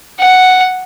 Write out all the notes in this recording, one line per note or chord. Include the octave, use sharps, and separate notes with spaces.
F#5